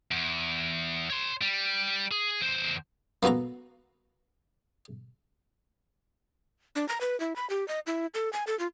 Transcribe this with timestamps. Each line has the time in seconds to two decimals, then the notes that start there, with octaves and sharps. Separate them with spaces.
0.11 E2
1.10 C#5 C6
1.41 G3
2.11 G#4
2.42 E2 C5
3.23 A#3 B3 F#4 A4 A#5
6.76 D4
6.89 A#5
7.01 B4
7.20 E4
7.36 B5
7.50 G4
7.68 D#5
7.87 E4
8.14 A4
8.33 G#5
8.47 A4
8.59 F4